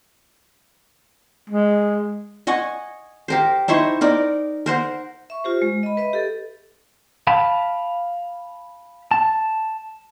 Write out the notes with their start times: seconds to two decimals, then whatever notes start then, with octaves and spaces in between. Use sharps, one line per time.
1.50 G#3
2.47 D#5 F#5 G#5 C#6
3.28 G4 A#4 C5
3.68 D#4 E4 C5 C#6
4.01 D#4 A#4 D5
4.66 A#4 C5 F#5
5.30 E5 C#6
5.44 F4 G4 C5
5.62 G#3
5.83 D#5 B5
5.97 B4 D#5 E5
6.13 G4 A4
7.27 F5 A5 B5
9.11 A5